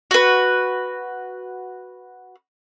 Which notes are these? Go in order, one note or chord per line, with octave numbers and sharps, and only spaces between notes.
F#4 B4